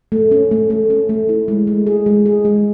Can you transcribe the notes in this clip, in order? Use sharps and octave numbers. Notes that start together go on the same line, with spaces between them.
A3
C#4
A3
A3
C#4
A3
E4
G#3
G#3
G#4
G#3
G#4
G#3